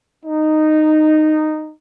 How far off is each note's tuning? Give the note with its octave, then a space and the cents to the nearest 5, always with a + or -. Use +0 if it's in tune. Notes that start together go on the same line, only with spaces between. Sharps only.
D#4 -10